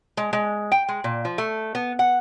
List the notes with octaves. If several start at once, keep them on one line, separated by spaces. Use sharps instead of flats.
G#3
G#3
G5
G#3
A#2
F3
A3
B3
F#5